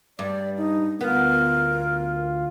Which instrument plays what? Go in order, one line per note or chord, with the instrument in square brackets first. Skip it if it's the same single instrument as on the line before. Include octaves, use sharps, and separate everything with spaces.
[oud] G2 [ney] D5
[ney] D#4
[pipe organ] D2 F4 [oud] B3 [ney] A#4